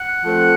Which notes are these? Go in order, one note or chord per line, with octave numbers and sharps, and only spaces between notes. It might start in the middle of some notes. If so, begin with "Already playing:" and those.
Already playing: F#5
F3 A3 C4